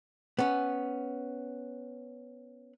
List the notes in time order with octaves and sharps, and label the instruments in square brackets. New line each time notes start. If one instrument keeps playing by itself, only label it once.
[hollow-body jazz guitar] B3 C#4